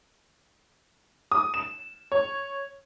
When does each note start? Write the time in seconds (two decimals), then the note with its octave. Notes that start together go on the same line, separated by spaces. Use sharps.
1.31 D#6
1.54 E7
2.12 C#5